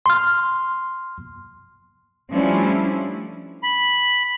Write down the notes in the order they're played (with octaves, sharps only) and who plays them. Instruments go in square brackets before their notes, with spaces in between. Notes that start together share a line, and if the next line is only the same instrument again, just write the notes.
[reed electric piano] C6 F6
[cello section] F3 G3 A3 C#4 D4 E4
[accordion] B5